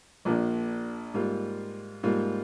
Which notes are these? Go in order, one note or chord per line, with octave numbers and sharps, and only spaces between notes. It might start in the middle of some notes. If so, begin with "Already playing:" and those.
A#1 A#2 F3 A#3 D4
G#2 G3 A#3 F4
G#2 G3 A#3 F4